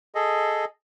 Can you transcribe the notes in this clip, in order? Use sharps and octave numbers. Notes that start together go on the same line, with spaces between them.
G#4 A4 D#5